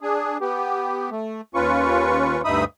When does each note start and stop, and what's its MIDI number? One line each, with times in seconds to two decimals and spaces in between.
0.01 0.38 62
0.01 0.38 68
0.41 1.10 59
0.41 1.10 67
1.11 1.41 57
1.55 2.42 39
1.55 2.42 61
1.55 2.42 65
1.55 2.42 71
1.55 2.42 85
2.45 2.64 38
2.45 2.64 43
2.45 2.64 63
2.45 2.64 76
2.45 2.64 83
2.45 2.64 87